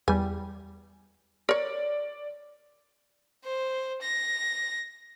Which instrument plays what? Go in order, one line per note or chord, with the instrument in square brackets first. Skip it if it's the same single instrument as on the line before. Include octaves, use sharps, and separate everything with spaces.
[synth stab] E2 G3 [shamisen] G#5
[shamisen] A#4 C#5 [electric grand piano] D5
[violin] C5
A#6